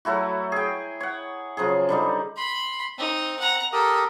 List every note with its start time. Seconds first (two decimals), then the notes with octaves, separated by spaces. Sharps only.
0.05 F#3 A3 E4 F#4
0.52 G#4 G5
1.01 C#5 F#5
1.57 C#3 F3 F#3 G#4
1.89 D3 G3 D#4
2.37 B5 C6
2.98 C4 D#4
3.39 F#5 A#5
3.73 G4 A4 A#4 D#6